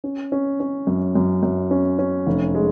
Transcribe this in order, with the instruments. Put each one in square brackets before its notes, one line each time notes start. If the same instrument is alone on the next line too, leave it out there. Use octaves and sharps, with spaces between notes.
[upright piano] C#4
C#4
C#4
F#2
F#2
F#2
C#4
C#4
F1
G#3